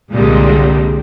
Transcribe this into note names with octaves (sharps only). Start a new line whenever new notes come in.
C2 A#2 D3 G3 G#3 C4